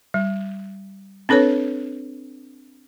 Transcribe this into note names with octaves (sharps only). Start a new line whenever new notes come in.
G3
C4 D4 A4 B4 C#5